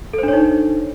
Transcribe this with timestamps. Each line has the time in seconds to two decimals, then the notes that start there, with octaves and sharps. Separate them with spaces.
0.13 A4
0.18 C5
0.23 D4
0.28 C#5
0.33 D#4